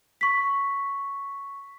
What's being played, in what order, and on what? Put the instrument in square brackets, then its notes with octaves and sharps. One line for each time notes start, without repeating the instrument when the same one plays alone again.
[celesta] C#6 B6